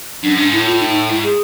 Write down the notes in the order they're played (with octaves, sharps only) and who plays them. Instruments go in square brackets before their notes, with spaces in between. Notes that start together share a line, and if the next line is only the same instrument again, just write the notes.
[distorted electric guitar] F#2 [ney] D4
[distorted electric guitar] G#2 [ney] D4
[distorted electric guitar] A2 [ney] E4
[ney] F4
D#4
[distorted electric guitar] G#2 [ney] E4
[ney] G#4